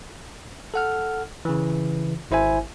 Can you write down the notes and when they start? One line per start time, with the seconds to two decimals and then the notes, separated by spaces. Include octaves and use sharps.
0.74 A4 F#5 F6
1.45 C#3 E3
2.31 G#1 E4 C5 E5 G#5